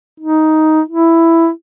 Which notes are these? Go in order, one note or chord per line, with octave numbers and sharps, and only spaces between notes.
D#4
E4